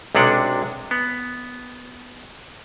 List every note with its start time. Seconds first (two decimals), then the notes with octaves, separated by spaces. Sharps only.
0.15 B1 C3 G#3 D4 F#5
0.91 B3